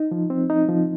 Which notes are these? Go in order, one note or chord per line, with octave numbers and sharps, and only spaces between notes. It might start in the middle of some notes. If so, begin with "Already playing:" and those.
Already playing: D#4
F3
C4
D#4
F3